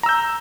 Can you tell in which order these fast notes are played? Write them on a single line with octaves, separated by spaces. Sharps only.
A#5 E6 G6